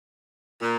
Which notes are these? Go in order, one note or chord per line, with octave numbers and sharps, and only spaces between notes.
A#2